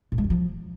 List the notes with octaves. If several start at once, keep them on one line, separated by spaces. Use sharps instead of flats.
A2
G#3
F#2
F3